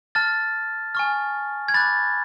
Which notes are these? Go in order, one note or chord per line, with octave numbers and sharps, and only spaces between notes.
A5 F6 A6
G#5 C#6 F6
G#6
B5 D6 F#6 A6